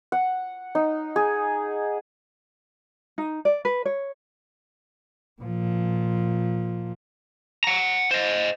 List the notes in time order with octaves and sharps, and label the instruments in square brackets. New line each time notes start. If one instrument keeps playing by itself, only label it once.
[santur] F#5
D#4
G#4
[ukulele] D#4
D5
B4
C#5
[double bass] A#2 F3
[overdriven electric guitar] F#5 A#5
C5 D#5